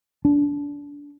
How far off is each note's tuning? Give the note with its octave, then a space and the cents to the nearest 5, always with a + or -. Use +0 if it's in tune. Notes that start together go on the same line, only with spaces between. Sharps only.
D4 -25